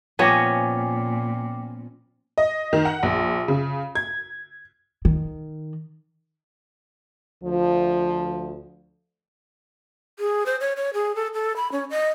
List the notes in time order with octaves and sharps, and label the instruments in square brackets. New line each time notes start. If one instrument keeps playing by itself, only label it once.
[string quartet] A#2 [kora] F3 B3 C#4 [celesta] G5 D6 [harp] G#5 A#6
[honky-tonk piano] D#5
D#3
F#5
A#1
C#3
G#6
[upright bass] D#3
[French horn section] D2 F3
[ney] G#4
C5
C#5
C#5
G#4
A4
A4
B5
C#4
D#5